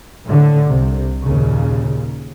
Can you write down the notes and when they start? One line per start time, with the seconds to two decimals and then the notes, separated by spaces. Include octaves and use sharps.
0.24 A2 D3
0.67 C2 C3
1.23 D#2 A#2 C#3